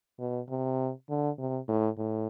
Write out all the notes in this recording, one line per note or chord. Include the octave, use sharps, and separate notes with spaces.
B2
C3
D3
C3
A2
A2